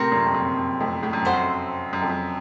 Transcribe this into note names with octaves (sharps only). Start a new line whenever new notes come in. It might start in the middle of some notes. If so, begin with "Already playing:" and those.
Already playing: A2 C3 C4 A#4 C#5
F#2 A#2
F2
F#2
F#2
F2 A2
A2
F#2
F2 A3 C4 F#4 C5
F#2
F#2
F2
F#2